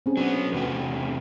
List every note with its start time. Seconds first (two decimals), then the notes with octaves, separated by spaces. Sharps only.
0.06 C4 C#4 G#4
0.17 F#3 B3 C#4 D4
0.52 E2 C3 A3 F#4 B4